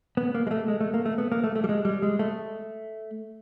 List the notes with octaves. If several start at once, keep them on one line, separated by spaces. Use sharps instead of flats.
B3
A#3
G#3
A3
G#3
A3
A#3
A3
B3
A#3
A3
A3
G3
G#3
G3
G#3
A3